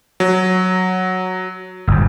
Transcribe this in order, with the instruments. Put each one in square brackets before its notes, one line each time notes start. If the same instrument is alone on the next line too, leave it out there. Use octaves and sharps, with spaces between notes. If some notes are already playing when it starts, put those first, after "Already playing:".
[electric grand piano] F#3
[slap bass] G1 D#2 G#2